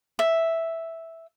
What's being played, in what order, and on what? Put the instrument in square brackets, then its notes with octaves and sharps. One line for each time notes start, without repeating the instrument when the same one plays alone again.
[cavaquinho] E5